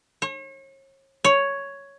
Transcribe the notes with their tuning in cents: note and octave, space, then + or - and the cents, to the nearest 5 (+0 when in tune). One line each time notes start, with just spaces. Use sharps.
C#5 -40
C#5 +5